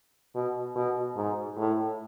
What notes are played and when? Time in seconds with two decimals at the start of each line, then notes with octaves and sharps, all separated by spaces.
0.35 B2
0.76 B2
1.16 G#2
1.58 A2